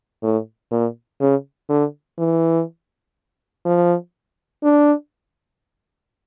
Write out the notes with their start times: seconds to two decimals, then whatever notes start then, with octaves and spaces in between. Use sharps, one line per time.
0.22 A2
0.71 A#2
1.20 C#3
1.69 D3
2.18 E3
3.65 F3
4.63 D4